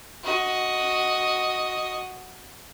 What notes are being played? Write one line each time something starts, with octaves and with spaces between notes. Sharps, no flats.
F#4 D#5